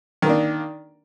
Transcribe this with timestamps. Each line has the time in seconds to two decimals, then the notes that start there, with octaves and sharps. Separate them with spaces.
0.22 D#3
0.26 A#3
0.29 D4